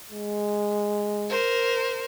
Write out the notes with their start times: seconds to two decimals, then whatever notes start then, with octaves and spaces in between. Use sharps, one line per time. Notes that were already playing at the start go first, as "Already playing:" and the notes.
0.11 G#3
1.30 A#4 C5